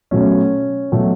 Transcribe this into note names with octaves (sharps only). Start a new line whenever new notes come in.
B2 F#3 A3 C#4
B2 F#3 A3